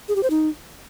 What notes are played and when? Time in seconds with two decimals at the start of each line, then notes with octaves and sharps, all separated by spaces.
0.09 G#4
0.16 G4
0.23 C5
0.30 D#4